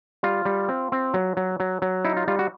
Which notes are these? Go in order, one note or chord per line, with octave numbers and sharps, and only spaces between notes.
G3 F4
G3
C4
C4
F#3
F#3
F#3
F#3
D#4 E4
F4
G3 F4
F#4